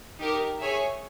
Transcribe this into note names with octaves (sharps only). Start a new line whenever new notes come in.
D#4 G4 A#4
G#4 C#5 E5 G#5